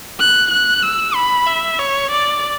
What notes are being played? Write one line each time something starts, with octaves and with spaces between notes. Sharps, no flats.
F#6
F#6
E6
B5
E5
C#5
D5